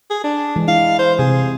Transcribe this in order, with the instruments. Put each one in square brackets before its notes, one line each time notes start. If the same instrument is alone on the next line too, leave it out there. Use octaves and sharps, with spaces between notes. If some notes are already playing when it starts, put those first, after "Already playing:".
[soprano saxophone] G#4
D4
[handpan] E3 G#3
[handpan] E4 [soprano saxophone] F5
[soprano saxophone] C5
[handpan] C3 [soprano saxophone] G#4